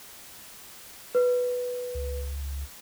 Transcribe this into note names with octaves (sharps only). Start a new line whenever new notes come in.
B4
C#2